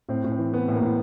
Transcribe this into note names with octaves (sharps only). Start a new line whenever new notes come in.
A2 C4
A2
C4
E3
E3 B3
A2
A#3
A2